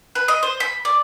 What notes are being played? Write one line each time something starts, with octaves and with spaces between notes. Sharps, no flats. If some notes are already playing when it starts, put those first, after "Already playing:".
B4
D#5
C5
B5
D5